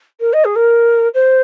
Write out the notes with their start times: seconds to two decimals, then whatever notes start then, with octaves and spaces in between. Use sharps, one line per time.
0.20 A#4
0.33 D#5
0.45 G#4
0.56 A#4
1.14 C5